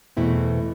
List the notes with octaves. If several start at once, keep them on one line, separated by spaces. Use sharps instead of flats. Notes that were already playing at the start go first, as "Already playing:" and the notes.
E2 B2 A3 C4 E4